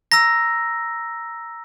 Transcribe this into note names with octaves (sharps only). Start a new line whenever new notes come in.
A#5 E6 A#6